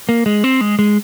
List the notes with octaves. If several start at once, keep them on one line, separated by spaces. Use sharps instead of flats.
A#3
G#3
C4
G#3
G#3